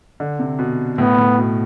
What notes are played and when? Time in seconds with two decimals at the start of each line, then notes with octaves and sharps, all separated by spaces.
0.20 D3
0.39 C3
0.59 B2
0.98 A2 B3
1.18 A2
1.38 B2